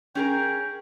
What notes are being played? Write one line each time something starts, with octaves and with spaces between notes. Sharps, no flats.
C#4 G#4 A#4 G5